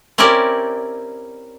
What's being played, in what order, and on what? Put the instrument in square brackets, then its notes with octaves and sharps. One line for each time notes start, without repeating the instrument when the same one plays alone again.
[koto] C4 C#4 E4 G4 A#4 D5